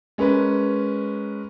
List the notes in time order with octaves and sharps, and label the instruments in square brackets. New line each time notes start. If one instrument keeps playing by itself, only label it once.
[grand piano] G#3 C#4 A#4 B4